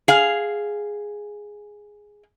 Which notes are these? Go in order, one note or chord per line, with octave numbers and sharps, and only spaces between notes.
G#4 F5